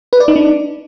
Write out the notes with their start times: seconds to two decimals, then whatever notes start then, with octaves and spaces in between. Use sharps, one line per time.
0.13 B4
0.20 D5
0.28 D#4
0.36 D4